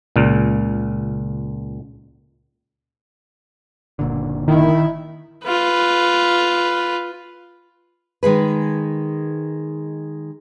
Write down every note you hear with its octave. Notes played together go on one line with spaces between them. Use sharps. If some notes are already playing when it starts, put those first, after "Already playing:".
C#2 A#2
F#1 A#2 D3
D#3 E4
F4 B4
D#3 G#3 G#4 B4